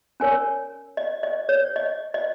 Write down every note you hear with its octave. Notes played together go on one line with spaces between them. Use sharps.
C#4 A#4 C#5 G#5
D#5
D#5
C#5
D#5
D#5